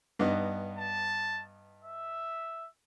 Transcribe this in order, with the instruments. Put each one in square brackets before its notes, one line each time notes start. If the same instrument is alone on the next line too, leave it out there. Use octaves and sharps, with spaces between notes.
[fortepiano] G2 B3 D#4
[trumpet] A5
E5